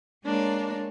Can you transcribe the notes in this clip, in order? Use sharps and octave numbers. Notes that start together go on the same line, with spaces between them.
G#3 A#3 D4 A#4 C#5